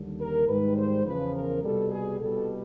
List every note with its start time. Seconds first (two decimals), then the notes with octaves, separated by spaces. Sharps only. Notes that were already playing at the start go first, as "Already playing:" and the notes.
Already playing: D#2 D3 G3
0.19 A#4
0.47 G#2 D#3 G3 B4
0.76 C5
1.04 E2 C#3 F3 B4
1.34 A#4
1.62 C2 B2 G3 A4
1.91 G#4
2.19 C2 B2 G3 A4